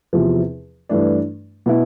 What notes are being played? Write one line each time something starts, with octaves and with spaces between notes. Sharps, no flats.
E2 C3 F3
G2 E3 A3 D4
B2 B3 E4